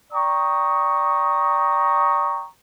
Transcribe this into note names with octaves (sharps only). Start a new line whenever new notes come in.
D5 G5 A#5 C#6 D#6